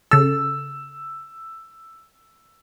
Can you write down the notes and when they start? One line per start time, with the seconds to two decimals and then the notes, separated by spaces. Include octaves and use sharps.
0.11 C#3 A4 E6